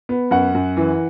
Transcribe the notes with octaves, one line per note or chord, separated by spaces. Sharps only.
B3
F#2 F#5
F#2
E3